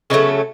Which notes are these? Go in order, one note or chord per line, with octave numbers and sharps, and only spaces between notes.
C#3 F#3 A3 B3 D#4